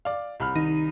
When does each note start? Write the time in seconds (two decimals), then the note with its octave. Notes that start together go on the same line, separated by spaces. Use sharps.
0.05 D5 F5
0.40 C2 B5 F6
0.56 D#3 D#4